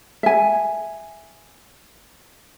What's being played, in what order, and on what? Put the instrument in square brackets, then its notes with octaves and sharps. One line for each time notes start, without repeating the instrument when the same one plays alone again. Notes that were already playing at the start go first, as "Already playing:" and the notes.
[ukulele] E5 G#5